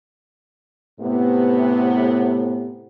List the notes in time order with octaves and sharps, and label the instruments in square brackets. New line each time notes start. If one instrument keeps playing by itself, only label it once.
[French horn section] A2 C3 B3